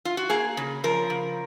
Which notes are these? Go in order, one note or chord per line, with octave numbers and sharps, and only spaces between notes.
F4
F#4
A#3 G#4
C#3
F3 A#4
C#3